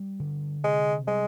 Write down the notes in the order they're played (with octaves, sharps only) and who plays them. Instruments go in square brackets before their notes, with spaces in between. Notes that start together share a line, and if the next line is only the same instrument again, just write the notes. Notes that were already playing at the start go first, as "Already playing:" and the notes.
Already playing: [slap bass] G3
D3
[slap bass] C3 [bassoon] G#3
[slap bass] G3 [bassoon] G#3